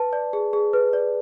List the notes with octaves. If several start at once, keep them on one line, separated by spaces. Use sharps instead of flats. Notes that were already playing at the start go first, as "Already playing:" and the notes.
Already playing: B4 A5
D5
G#4
G#4
B4
D5